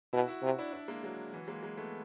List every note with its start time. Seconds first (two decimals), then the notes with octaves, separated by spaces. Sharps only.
0.13 B2 E4 F#4
0.28 E4 F#4
0.43 C3
0.59 D4 E4
0.73 D4 E4
0.88 G#3 A#3
1.03 F#3 G#3
1.33 E3 F#3
1.48 G#3 A#3
1.63 G#3 A#3
1.78 A3 B3